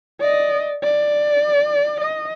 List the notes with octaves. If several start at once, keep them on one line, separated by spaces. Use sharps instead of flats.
D5 D#5
D5
D#5